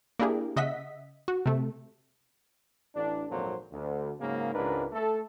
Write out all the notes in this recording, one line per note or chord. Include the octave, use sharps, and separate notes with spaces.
A#3 D4 E4 G4 G#4
C#3 D#5 E5 F#5 B6
F#4
C3 A3
A1 D4
G#1 F2 A#2 F#3 C5
D2
G#2 C#3 F#3 A#3
C#2 G#2 D4 A#4 B4
A3 A4